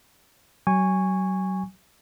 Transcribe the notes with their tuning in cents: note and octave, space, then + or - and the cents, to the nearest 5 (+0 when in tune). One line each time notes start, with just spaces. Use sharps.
F#3 +35 G#5 -15 C#6 +0